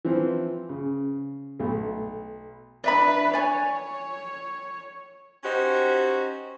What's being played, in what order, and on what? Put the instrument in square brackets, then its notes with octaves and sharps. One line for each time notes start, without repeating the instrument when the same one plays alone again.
[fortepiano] E3 F3 C4
C#3
B1 A3
[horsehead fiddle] D4 B4 [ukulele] D5 E5 B5
[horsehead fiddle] C#5 [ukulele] D5 G#5
[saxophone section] C#4 D#4 F#4 G4 C5